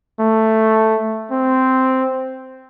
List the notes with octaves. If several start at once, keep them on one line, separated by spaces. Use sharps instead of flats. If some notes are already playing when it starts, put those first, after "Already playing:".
A3
C4